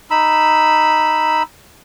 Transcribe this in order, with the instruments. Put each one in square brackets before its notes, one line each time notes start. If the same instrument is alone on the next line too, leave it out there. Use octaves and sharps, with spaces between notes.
[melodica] D#4 B5 E6